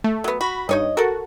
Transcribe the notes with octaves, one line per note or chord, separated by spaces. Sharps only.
A3
F#3 B3
F#4 B5
G2 D#4 C#5 D#5
F#4 A4 A#4